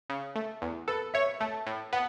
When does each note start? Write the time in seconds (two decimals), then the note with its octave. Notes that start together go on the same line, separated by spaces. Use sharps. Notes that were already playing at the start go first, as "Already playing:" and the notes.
0.10 C#3
0.35 A3
0.62 E2
0.88 A4 B4
1.14 C#5 E5
1.40 A3 A5
1.66 A2
1.92 B3 F#5